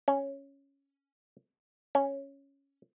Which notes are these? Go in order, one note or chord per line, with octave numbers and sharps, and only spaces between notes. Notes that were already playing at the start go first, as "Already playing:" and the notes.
C#4
C#4